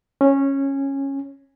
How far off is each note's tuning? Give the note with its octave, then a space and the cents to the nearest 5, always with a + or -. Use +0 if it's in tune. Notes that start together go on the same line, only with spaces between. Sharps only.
C#4 -15